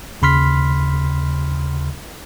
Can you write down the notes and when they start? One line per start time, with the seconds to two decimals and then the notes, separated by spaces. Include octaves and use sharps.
0.22 D#2 C#3 B5 C6 F6 B6